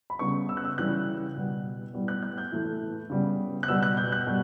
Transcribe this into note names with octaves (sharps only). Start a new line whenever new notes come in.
B5
C#3 G3 B3 C#6
E6
F#6
E6
C#3 E3 G3 F#6
B2 G3 B3
A2 G3 B3
F#6
F#6
G6
A2 E3 A3
C#3 G3 B3
F#6
B2 G3 B3 E6
F#6
G6
F#6
B2 G3